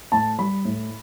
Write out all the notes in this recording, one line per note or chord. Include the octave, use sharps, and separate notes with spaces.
A2 A5
G3 B5
A2